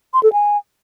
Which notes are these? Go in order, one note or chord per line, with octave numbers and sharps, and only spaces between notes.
C6
A4
G#5